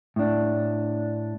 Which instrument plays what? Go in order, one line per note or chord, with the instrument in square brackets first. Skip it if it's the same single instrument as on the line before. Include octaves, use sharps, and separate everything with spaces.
[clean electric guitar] A2 D4